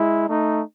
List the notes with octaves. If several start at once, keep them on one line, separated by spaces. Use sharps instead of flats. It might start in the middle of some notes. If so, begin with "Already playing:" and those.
Already playing: G#3 E4
A3 D#4